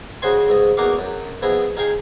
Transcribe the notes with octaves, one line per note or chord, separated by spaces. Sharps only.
C#3 F#4 C5 D#5 G#5 C6
C#2 G#2 D#5
E2 A#3 D#4 F#4 F5 D6
F#2
F3 B3 E4 G#4 D#5 D#6
D#4 G#4 F5 G5 G#5